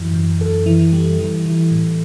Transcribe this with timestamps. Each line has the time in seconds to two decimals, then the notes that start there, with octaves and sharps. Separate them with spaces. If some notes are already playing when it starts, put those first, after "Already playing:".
Already playing: F#2 E3
0.14 F#2
0.40 F#2 A4
0.66 E3
0.93 G3
1.18 E3
1.46 E3
1.71 A2